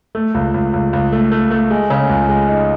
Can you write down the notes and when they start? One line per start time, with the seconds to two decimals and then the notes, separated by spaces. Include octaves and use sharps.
0.15 A3
0.35 C#2
0.54 C#2
0.74 C#2
0.93 C#2
1.13 A3
1.32 A3
1.51 A3
1.71 G#3
1.90 C#3
2.10 C#2
2.29 G#3
2.49 D#4